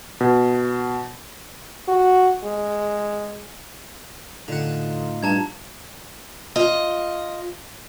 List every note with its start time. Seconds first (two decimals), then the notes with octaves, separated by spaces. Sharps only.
0.21 B2
1.88 F#4
2.44 G#3
4.48 A2 D3 D#4 F4 F#5
5.23 G2 A5 A#5 G#6
6.56 F4 D#5